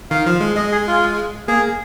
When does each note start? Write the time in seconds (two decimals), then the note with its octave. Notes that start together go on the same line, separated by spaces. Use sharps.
0.10 D#3 F5
0.26 F3
0.41 G#3
0.56 G#3 D#5
0.72 G#4
0.87 F4
1.48 A#3 G#4